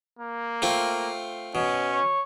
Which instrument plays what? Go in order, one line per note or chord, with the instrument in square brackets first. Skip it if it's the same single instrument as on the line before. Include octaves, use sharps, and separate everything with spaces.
[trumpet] A#3
[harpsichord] A3 C4 F4
[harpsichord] B2 [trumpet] C#4
[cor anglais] C#5